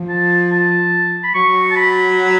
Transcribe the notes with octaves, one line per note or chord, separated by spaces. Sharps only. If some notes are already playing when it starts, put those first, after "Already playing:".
Already playing: F3
A5
A5
B5
F#3 C#6
A5
B5